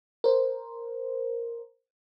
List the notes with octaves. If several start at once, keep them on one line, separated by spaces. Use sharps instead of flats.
A#4 C5